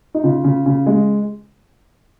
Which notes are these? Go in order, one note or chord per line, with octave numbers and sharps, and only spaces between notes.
D#4
C#3 F4
C#3
C#3
G#3